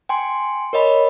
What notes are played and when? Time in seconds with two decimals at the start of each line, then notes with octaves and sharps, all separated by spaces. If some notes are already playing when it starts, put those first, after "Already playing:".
0.09 G5 G#5 C6
0.73 A#4 C#5 D#5 B5